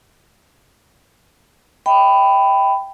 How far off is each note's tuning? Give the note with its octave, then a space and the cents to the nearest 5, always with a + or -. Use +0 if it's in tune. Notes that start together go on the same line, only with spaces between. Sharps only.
E5 -40 G5 +0 B5 +15